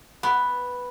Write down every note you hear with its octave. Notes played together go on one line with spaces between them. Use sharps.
B3